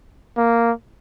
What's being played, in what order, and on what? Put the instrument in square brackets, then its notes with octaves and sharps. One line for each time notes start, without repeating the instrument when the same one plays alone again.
[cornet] A#3